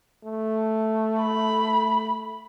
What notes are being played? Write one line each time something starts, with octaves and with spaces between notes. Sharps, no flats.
A3
B5